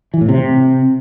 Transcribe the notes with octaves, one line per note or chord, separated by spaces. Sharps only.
E3
A2
C3